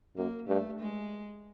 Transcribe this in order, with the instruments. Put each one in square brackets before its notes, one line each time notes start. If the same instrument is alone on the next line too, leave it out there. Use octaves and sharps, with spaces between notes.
[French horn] F#2 [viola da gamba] A#3
[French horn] G2 [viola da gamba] A3
[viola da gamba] G#3